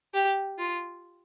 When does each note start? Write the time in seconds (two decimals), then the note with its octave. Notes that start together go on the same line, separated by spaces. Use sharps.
0.14 G4
0.58 F4